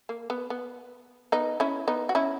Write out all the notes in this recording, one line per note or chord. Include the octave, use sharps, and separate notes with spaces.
A#3
B3
B3
B3 D#4
C#4 E4
B3 D#4
F#4
C#4 E4